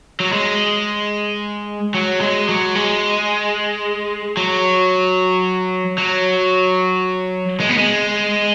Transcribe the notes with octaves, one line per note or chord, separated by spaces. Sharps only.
F#3
G#3
F#3
G#3
F#3
G#3
F#3
F#3
G#3
B3
G#3